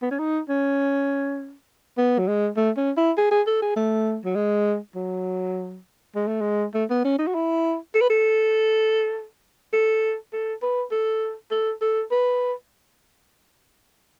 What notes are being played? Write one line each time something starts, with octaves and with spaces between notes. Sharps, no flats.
B3
C#4
D#4
C#4
B3
F#3
G#3
A3
C#4
E4
G#4
G#4
A4
G#4
A3
F#3
G#3
F#3
G#3
A3
G#3
A3
B3
C#4
D#4
F#4
E4
A4
B4
A4
A4
A4
B4
A4
A4
A4
B4